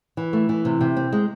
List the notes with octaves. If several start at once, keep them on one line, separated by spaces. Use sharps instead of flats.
E3
A3
E3
C3
C3
C4
G#3